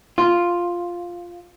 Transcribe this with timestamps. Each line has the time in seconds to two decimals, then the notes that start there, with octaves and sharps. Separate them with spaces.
0.18 F4